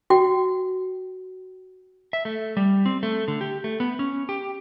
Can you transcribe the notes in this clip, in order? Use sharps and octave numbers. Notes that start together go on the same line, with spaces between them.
F#4 G5
E5
A3
G3
C4
A3
D3
G4
A3
B3
C#4
G4